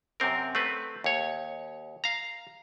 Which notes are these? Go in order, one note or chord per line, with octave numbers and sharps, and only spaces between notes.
F#2 C3 C4 A#4
A3 C4 B4
D#2 C#5
F5 A#5